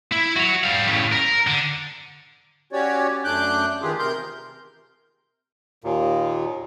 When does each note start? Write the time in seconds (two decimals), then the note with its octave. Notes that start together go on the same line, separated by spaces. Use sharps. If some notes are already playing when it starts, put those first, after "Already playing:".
0.12 E4
0.36 F#4 C#5
0.64 G3 F5
0.88 A2 C#3
1.12 A#4
1.47 D3
2.73 C#4 F#4 G4 C#5 D5
3.24 F#2 A3 D4 D6 F#6 G6
3.82 D#3 E3 F4 G4 G#4
3.99 C3 A#4 C6 G6
5.84 D#2 A#2